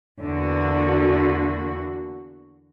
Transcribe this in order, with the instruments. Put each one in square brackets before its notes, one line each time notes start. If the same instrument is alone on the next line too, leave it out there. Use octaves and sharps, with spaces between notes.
[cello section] E2 D3 A#3 F#4